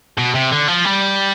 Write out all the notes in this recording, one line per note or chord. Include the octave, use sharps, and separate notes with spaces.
B2
C3
D3
F3
G3